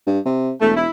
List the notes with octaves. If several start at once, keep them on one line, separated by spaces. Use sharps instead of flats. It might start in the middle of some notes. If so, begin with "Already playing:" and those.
G2
C3
E1 A3
E4